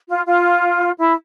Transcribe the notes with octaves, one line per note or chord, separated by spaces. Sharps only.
F4
F4
E4